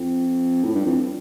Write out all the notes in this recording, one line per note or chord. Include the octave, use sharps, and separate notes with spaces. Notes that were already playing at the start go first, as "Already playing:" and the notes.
Already playing: F2
A2
G2
F2